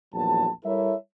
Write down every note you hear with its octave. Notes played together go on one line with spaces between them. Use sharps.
A#1 E2 F#3 A5
G3 E4 A4 A#4 C#5 E5